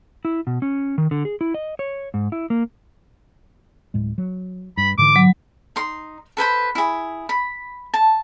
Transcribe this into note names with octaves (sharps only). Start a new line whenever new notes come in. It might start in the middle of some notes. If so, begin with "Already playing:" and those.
E4
B2
C#4
D#3
D3
G#4
E4
D#5
C#5
G#2
E4
A#3
D1 A2 G#3
F#3
G2 B5
G#2 D3 E3 D6
F#3
D#4 C6
A4 B4 C5 B5
E4 G#4
B5
A5